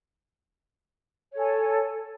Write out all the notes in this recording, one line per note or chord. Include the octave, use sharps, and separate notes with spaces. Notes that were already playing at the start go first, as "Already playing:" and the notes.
A4 C#5 G#5